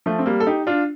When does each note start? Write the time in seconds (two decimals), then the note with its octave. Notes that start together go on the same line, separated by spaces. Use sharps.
0.06 F3 A3
0.19 C4
0.26 G3 A#3
0.40 A4
0.47 D#4 G4
0.67 D4 F4